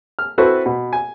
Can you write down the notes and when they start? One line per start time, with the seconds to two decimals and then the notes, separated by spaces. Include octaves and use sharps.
0.19 F6
0.38 C4 E4 F#4 A4 B4 C5
0.66 B2
0.93 G#5